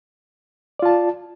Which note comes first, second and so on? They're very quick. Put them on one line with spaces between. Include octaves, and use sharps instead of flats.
D5 F4 A5